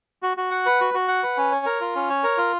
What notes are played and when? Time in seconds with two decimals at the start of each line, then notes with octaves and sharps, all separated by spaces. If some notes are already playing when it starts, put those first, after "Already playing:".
0.23 F#4
0.37 F#4
0.51 F#5
0.66 B4
0.80 F#4
0.94 F#4
1.08 F#5
1.23 B4
1.37 C#4
1.52 C#5
1.66 A#4
1.81 F4
1.95 C#4
2.10 C#5
2.24 A#4
2.38 F4